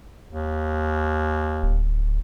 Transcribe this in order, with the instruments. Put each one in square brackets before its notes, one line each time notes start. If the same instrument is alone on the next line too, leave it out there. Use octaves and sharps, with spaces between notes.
[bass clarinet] D#2
[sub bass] D1